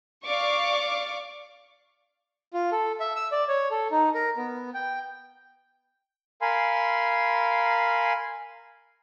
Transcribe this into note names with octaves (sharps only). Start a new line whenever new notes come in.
D5 F5 C#6 D6
F4
A4
E5
E6
D5
C#5
A4
D#4
A#4
B3
G5
A#4 F5 G#5 B5 C6